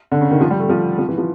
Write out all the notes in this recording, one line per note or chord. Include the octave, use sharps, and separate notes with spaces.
D3
C#3
D#3
F3
G3
A3
F3
F3
E3
F3